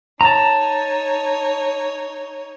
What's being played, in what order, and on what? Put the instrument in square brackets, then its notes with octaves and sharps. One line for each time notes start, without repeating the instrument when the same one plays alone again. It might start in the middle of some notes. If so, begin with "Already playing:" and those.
[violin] D#4 C#5 [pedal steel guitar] A5 A#5